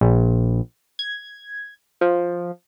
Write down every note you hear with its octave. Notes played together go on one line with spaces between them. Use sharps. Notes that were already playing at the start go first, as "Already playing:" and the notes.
A#1
G#6
F3